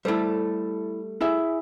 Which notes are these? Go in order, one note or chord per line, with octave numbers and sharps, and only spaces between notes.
G3 A3 E4 A4 C5
E4 G#4 E5